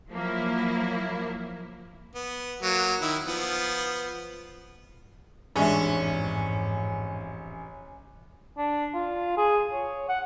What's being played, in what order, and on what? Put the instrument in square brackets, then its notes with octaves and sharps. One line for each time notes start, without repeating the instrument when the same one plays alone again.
[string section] F3 F#3 A#3 E4
[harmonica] B3
F#3 A#3
D#3 E4
F3 B3
[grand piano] A1 E5 [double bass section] F2 G#2 [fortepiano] G#3 D4 [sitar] C#4
[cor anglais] D4
F4
G#4
C#5
F#5